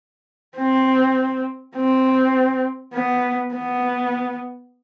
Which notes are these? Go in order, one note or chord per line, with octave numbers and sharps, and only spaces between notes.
C4
C4
B3
B3